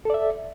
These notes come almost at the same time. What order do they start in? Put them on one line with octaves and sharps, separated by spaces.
A4 D5 E5